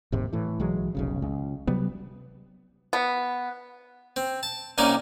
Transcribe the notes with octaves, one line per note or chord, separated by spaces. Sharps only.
F1 D#2 G#2 C3
A2 E3
B1 E3 F#3 G#3
F1 B1 C#3
C#2
C3 F#3 G3 B3
B3
C4
A5
C2 A#3 C#4 D#4 D5